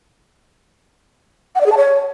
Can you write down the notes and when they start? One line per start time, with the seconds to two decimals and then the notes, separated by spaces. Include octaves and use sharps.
1.55 F#5
1.61 D5
1.66 G#4
1.72 A5
1.77 C#5